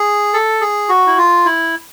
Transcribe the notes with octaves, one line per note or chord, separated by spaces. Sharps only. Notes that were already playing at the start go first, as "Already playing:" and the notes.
Already playing: G#4
A4
G#4
F#4
E4
F4
E4